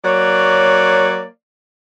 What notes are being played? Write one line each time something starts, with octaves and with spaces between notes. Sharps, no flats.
F#3 A#3 C#5 D5